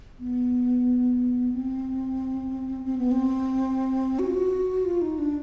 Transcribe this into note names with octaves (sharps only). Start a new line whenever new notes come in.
B3
C4
C4
B3
C4
F#4
F4
F#4
F4
D#4
D4